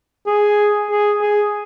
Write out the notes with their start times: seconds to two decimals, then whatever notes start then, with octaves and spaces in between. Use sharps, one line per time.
0.26 G#4
0.91 G#4
1.22 G#4